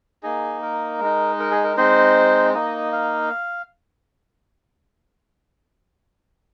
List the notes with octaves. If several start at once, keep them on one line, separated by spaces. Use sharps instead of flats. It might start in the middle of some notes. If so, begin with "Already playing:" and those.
A#3 D#4 G#4
A#4
G#3 D#4
A#4
G#4
A#4
G#3 C4 D#4 C5
A#3 D#4 D#5
F5